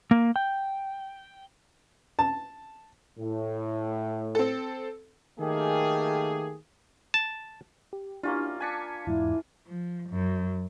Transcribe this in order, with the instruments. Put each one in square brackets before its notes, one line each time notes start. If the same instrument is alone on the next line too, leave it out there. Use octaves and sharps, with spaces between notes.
[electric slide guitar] A#3
G5
[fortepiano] A5
[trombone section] A2
[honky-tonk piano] C4 A4
[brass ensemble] D#3 A3 A#3 G4 G#4
[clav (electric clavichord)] A5
[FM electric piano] G4
[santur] A#3 C#4 F4 [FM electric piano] D4 E4 G4
[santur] D4 G#5 [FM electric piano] A5 B6 C#7
[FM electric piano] E2 G#2 [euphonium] E4
[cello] F3
F#2